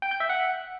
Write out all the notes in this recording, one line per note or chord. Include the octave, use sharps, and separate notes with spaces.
G5
G6
E5
F#5